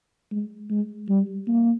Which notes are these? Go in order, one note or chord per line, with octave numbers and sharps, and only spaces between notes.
G#3
G#3
G3
A#3